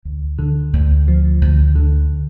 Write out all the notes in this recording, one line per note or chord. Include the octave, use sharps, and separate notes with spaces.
D2
D3
D2
F3
D2
D3